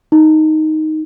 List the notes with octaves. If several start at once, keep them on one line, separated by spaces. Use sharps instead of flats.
D#4